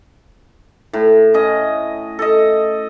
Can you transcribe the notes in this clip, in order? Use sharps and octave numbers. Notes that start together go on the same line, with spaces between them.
A2
C#4 D#5
A4 D#5